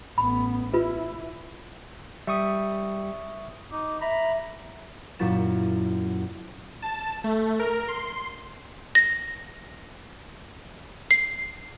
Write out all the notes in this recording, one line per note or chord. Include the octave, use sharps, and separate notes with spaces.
A1 B3 B5
E4 F4 B4
G3 E5 C#6 D#6
D#4 D6
E5 A#5 B5
F#2 A#2 F#3 E4 A6 E7
A5
A3
A#4
C6
A#6
C7